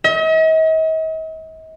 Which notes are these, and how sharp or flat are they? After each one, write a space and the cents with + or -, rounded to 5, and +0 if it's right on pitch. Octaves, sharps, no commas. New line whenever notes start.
D#5 +45